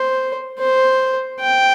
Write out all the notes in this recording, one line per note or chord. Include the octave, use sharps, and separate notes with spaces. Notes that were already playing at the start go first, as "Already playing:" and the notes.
Already playing: C5
C5
G5